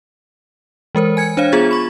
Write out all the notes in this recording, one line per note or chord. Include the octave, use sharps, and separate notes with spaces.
E3 G#3 A#4 C5
G#5 G#6 C#7
D4 C5 C#5 F5
B3 F4 G#4 G#6 A6
B5 C#6